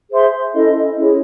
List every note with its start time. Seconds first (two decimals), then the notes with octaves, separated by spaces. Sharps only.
0.09 G#4 C5 E5 C6
0.52 C#4 E4 A4 D#5
0.96 C#4 E4 G#4 C#5